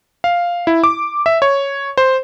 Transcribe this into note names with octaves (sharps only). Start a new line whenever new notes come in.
F5
E4
D6
E5
C#5
C5